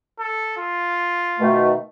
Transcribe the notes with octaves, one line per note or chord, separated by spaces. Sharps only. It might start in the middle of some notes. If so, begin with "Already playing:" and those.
A4
F4
B2 D#3 A3